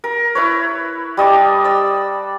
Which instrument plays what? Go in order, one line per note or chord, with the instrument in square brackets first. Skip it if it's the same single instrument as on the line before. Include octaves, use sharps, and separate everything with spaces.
[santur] A#4
E4 B4 C#5
G3 D#5 A5 D6
D5 E6